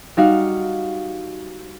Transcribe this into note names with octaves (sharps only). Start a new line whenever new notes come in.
G3 D#4 F#4 F5